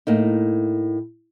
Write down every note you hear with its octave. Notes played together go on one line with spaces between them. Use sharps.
A2 A#3 D#4